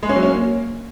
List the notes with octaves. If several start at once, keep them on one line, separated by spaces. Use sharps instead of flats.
G#3
C#4
F#3
C#4
A#3